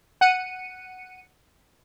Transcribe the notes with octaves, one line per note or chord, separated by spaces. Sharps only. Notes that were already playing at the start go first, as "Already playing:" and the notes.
F#5 C#7 D#7